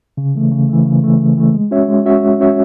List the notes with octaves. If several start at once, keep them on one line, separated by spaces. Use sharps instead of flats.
C#3
E3 A3
C#3
E3 A3
C#3
E3 A3
C#3
E3 A3
G#3
C#4 F#4 C#5 E5
G#3
C#4 F#4 C#5 E5
G#3
C#4 F#4 C#5 E5